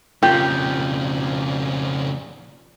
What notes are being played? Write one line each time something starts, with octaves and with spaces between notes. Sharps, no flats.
F2 A#2 C#3 G4